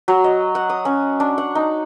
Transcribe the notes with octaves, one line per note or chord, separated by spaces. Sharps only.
F#3
D#5
F#5
D#6
C#4
D4
F#5
D#4